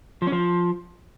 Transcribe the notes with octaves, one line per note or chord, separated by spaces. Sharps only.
F3
C#4
F3